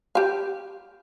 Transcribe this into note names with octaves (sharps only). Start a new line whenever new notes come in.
G4 F5